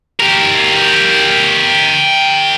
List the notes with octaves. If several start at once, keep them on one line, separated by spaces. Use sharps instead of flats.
G4 A#4